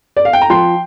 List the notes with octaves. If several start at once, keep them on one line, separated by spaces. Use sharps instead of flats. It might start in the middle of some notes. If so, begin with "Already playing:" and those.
D5
F5
G5
A#5
F3 G5 C6